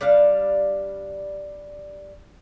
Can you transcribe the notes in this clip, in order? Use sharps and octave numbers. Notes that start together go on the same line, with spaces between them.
G3 D4 F5